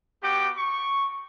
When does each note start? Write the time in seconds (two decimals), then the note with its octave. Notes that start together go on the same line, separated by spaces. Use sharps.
0.23 G3 B3 F#4 G4 G5 D6
0.56 C#6